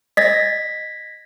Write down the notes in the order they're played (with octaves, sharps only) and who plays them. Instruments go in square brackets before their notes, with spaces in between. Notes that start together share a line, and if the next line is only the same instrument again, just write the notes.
[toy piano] D#5 [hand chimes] G#6 A#6 B6